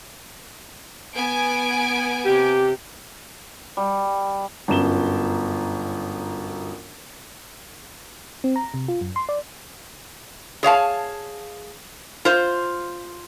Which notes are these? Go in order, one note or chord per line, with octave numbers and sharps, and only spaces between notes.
B3 G#5 D7
C3 G4
G3
G1 F#2 E7 G7
C4
A#5
C3
F4
F#2
C6
D5
G#4 C#5 F5 A5
F4 C5